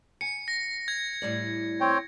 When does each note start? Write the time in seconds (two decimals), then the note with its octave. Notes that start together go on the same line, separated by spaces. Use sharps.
0.21 G#5 C#7
0.48 A#6
0.88 G#6
1.22 A2 G3 D5
1.81 C4 C#5 G5